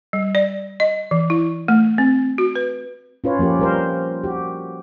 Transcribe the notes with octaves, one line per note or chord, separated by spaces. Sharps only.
G3
D5
D#5
E3
E4
A3
C4
F#4
B4
C#4 F4 B4 C#5
F3 A#3 C#4 G4
G3 A#4 C5
F#4 G4